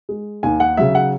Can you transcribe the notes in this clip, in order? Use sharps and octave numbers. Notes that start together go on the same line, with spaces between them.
G#3
D#2 G#5
F#5
C#3 F#3 E5
F#5